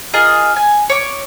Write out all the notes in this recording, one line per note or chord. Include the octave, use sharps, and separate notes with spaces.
F4 G#4 A#4 D#5
G#5
C#5 D6